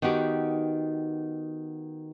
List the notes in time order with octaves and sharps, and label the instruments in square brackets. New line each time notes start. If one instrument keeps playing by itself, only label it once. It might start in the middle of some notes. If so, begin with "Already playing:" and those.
[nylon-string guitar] D#3 B3 D#4 F#4 G4